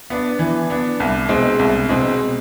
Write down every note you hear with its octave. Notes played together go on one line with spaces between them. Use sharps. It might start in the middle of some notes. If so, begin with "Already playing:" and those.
B3 D4
E3
B3 D4
C2
B2 G#3 C4
C2
B2 G#3 C4